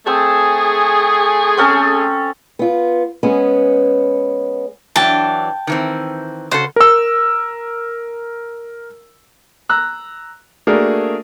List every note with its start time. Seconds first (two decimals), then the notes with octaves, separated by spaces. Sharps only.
0.07 A3 C4 G#4 A5
1.57 C4 C#4 A4
2.59 B3 F4
3.23 G#3 B3 C#4
4.96 E3 F#3 D4 G5 A5
5.67 D#3 E3 C4
6.51 C#3 F#4 A4 C5
6.76 A#4 E6
9.69 A#5 E6 F#6
10.67 A3 A#3 D4 F#4 G#4 A#4